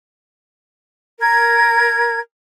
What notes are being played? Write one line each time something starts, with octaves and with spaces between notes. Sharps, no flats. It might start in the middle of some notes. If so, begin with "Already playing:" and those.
A#4 G#6